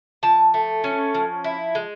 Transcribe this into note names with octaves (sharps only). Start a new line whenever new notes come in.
F3 A5
A3
C#4
F3
E4
G#3